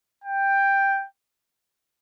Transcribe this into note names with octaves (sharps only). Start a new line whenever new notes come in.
G5